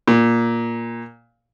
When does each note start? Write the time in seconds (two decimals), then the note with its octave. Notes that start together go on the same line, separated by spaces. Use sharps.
0.08 A#2